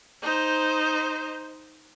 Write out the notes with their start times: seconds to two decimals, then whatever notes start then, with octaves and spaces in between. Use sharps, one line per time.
0.22 D#4 C5